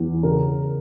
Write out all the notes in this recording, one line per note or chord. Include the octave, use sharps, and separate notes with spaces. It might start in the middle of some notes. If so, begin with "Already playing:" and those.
Already playing: E2
C#3 A#4